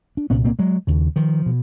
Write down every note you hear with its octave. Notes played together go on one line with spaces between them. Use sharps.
D4
C2 A#2 B3 C#4
A#3 C4
F#3 G#3
D#2 C#3
D#3 F3
B2